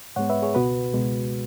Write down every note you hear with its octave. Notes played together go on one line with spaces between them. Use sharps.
G#2 G#3 B3 C#5 F#5
B4 E5
G#4 C#5
C#2 B2 B3 F#4 B4
C#2 B2 G#3